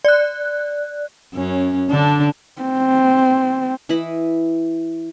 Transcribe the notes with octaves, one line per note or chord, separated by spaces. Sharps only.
D5 F#6
F#2 C#4
D3 D4
C4
E3 E4 D#5 B5